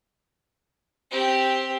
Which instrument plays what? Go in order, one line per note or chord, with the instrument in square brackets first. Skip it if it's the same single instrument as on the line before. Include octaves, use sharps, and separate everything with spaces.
[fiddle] C4 G4